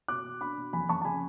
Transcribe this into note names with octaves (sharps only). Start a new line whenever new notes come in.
B2 D6 F#6
B2
D4 B5 D6
B2
F2 G#5 B5
F2 A5 C#6
A5
C#3 G#5 B5